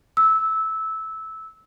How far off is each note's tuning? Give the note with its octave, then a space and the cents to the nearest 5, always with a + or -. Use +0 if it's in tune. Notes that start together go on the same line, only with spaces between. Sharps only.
E6 -15